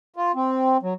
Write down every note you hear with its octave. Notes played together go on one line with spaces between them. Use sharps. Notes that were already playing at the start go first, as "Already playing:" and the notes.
F4
C4
F#3